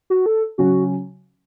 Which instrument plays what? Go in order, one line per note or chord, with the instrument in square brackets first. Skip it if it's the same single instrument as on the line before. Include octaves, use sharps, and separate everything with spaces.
[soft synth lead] F#4
A4
[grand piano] C#3 F#3 C#4 [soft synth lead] F#4